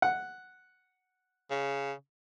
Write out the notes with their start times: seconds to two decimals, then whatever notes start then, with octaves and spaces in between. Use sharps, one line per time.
0.02 F#5
1.51 C#3